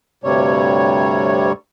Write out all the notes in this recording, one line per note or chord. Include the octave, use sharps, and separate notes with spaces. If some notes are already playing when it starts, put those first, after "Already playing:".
D2 G2 C3 G3 C#5